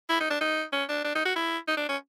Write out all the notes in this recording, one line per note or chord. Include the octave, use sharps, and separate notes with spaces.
E4
D#4
D4
D#4
C#4
D4
D4
D#4
F#4
E4
D#4
D4
C#4